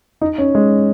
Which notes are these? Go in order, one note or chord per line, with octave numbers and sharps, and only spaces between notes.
D#4
C#4
G#3